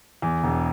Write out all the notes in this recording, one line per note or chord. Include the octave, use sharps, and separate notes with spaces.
E2
E1